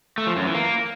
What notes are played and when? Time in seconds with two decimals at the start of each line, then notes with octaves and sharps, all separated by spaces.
0.18 A3
0.27 F3
0.36 F#2
0.45 E3
0.54 A#3